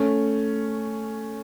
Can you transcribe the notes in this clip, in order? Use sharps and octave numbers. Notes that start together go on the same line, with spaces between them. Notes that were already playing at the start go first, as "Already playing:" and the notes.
Already playing: A3 C#4